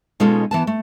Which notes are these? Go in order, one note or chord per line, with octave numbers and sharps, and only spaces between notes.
B2 G#3 C#4 D#4 F4 A4
E3 B3 A5
A3